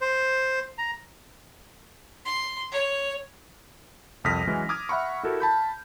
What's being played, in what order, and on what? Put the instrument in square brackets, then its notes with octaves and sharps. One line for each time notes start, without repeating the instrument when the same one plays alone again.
[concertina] C5
A#5
[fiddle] C6
C#5
[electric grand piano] C2 F2 D#6 F6 A#6 B6
E3 F#3 G#3 C#4
D6 D#6 F6 G#6
E5 F#5 B5 C#6
E4 F#4 G4 A4 A#4
A5 B5 G6